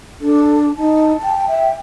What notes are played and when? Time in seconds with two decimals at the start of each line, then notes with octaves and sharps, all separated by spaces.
0.21 D4 A4
0.77 D#4 A5
1.23 G5
1.47 E5